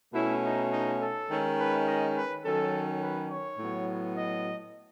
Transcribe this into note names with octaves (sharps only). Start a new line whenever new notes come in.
B2 A3 C#4 E4
D#4
D#4
A4
D#3 G#3 C#4
B4
D#5
B4
D#3 F#3 C#4 A4
B4
C#5
A2 F#3 B3
D#5